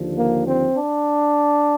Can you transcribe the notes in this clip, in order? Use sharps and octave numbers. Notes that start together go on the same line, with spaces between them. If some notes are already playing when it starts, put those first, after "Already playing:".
Already playing: D#2 D3 F3
A#3
C4
D4